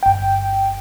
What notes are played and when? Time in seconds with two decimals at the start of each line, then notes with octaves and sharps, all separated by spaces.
0.03 G1 G5